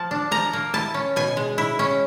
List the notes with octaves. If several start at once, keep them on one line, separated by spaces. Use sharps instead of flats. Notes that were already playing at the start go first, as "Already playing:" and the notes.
Already playing: F3 A5
D4
F3 A#5
A#3
E4 A5
C#4
B2 G#5
G#3
E4
C#4